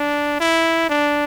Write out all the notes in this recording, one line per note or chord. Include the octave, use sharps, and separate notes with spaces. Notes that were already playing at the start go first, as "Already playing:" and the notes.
Already playing: D4
E4
D4